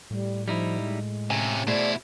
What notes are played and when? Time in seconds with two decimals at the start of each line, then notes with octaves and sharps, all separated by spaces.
0.11 A2 G3
0.48 F3 G3 D#4 E4
0.81 G#3
1.30 C3 C#4 G#5
1.67 B2 A3 E4 G#4 C5 D5